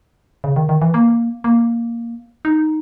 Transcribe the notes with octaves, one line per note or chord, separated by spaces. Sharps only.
C#3
D#3
D#3
E3
A#3
A#3
D#4